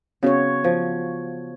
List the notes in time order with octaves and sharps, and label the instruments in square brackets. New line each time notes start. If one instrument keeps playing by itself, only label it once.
[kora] C#3 [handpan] B3 F#4 C#5
[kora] F3